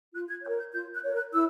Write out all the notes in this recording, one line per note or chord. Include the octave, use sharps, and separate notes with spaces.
F4 F#6
G#6
A#4 C#5 G6
G6
F4 G6
F#6
A#4 C#5
F#6
E4 E6